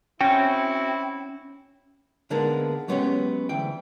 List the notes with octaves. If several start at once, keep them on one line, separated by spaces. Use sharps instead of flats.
C4 C#4 E4 F#4 G5
D3 G#3 A#3 B3 D4 D#4
F#3 G#3 B3 C#4 G4 C#5
D2 E3 G5